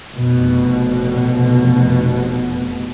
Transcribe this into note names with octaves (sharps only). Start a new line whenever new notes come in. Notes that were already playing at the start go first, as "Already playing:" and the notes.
F1 B2